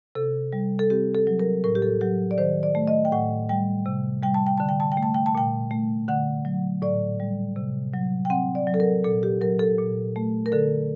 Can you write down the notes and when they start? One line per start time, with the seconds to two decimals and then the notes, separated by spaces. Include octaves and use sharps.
0.15 C3 A4
0.53 G3
0.79 A4
0.90 C4 G4
1.15 A4
1.27 F#3
1.40 A#4
1.64 A2 A#4
1.75 G4
1.82 A4
2.01 F#3 G4
2.31 D5
2.38 D#3 C5
2.63 D5
2.75 A3
2.88 D#5
3.05 G5
3.12 A2 F#5
3.49 G3 G5
3.86 C3
4.23 G3 G5
4.34 A5
4.47 G5
4.58 D3 A5
4.69 G5
4.80 A5
4.92 G5
4.97 A3
5.03 A5
5.14 G5
5.26 A5
5.35 A#2 G5
5.71 A3
6.08 D3 F#5
6.45 F#3
6.82 A2 D5
7.20 G3
7.56 C3
7.93 F#3
8.25 G5
8.30 C4 F#5
8.55 D5
8.67 F#3
8.74 A4
8.80 A#4
9.04 A#2 A4
9.23 G4
9.41 F#3 A#4
9.59 A4
9.78 A#2
10.16 A3
10.46 A#4
10.52 D3 A4